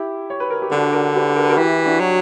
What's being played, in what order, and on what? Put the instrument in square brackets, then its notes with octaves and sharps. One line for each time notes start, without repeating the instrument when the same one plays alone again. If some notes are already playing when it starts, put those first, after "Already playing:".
Already playing: [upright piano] E4 G4
C#5
B4
A#4
G4
[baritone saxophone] D3 [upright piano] D4 F#4
[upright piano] F#4 A#4
G4 B4
A#4
B4
F#4 A#4
[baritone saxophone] E3 [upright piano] E4 G4
[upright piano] D4 F#4
[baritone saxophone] F#3